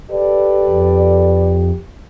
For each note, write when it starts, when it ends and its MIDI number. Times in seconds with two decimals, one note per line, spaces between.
0.11 1.80 67
0.11 1.62 69
0.11 1.62 71
0.11 1.62 74
0.66 1.71 41